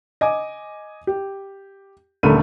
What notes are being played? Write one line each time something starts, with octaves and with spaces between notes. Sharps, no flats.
D#5 G#5 D6
G4
D#1 D3 A3 A#4 B5 D#7